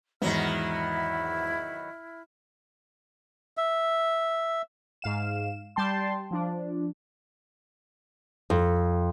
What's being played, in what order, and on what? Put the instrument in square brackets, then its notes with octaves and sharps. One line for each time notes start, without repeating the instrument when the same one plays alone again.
[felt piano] E2 G#2 [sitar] D#3 F#3 B3 [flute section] E4 F6
[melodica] E5
[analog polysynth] G#2 F5 E7
G3 G5 A5 C6
F3 D4
[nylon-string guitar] F2